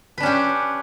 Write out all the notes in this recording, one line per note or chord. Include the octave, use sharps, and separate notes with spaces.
C#4 D4 G4 B4